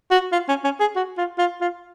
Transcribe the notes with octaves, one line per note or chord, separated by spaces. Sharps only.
F#4
F4
C#4
C#4
G#4
F#4
F4
F4
F4